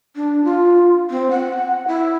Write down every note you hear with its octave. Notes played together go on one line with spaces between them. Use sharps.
D4
F4
C4
F#5
E4